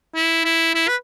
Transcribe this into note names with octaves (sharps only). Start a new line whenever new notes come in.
E4
E4
E4
B4